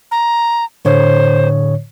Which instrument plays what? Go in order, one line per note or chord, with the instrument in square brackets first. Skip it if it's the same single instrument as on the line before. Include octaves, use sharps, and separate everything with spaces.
[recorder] A#5
[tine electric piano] A2 D3 C#5 [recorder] C5